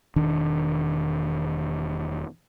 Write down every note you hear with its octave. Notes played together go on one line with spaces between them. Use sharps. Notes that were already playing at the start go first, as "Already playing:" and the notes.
E1 D#3 D4